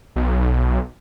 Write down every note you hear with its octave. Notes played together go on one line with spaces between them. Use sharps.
B1